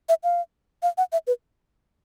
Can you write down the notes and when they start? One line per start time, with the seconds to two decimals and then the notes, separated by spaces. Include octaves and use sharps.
0.09 E5
0.24 F5
0.83 F5
0.98 F#5
1.12 E5
1.27 B4